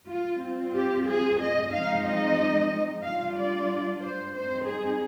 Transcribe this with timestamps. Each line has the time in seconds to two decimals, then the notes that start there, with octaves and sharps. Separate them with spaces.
0.09 F4
0.41 G3 C4 F4
0.74 G4
1.07 G#4
1.40 D#5
1.72 F3 G#3 C4 D#4 F5
2.05 D#5
3.03 G3 D4 F4 F5
3.36 D5
4.01 C5
4.34 G3 C4 D#4 C5
4.66 G#4